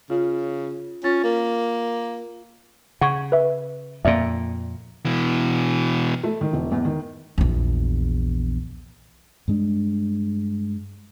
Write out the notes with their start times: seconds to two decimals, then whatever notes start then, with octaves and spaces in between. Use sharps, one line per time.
0.10 C#3 F4
1.04 C#4 F4 A6
1.24 A#3
3.01 C#3 F#5 C#6 G#6
3.32 B4 E5
4.05 F2 A#2 A#3 D5 E5
5.05 B2 E3
6.24 A3
6.41 D#3
6.53 E1
6.72 E2
6.85 D#3
7.38 A#1 E2
9.48 G2 G#3 D4